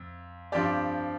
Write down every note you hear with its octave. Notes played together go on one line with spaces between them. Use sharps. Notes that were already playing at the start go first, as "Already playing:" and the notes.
Already playing: F2
G2 F3 C4 G4 D5